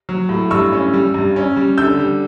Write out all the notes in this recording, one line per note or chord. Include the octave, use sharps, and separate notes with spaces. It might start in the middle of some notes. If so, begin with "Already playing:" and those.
F#3
A2
G2 C#6 E6
C#4
G3
G2
C#4
G3
D3 E6 G6
G3